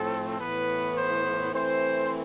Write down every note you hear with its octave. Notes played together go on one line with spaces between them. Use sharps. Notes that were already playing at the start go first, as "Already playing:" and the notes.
Already playing: A2 F3 A3 C4 A4
A2 E3 B3 B4
C5
E3 A3 C4 C5